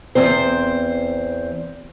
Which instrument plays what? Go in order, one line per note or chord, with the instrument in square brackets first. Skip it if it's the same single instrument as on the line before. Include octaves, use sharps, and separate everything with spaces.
[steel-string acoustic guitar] E2 C4 C5